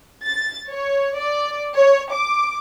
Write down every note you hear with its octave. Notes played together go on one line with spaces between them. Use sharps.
A6
C#5
D5
C#5
D6